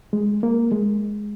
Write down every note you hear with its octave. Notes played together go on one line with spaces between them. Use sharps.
G#3
A#3
G#3